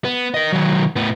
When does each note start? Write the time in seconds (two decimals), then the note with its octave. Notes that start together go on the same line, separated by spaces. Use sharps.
0.05 B3
0.34 A#4 D#5
0.53 D#3 F#3
0.96 A2 B3